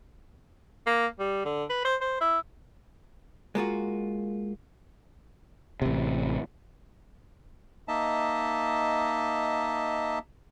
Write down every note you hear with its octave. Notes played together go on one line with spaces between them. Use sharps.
A#3
G3
D3
B4
C5
C5
E4
G#3 A#3 F4 F#4
A1 C3
A#3 D#4 D#5 E5 A5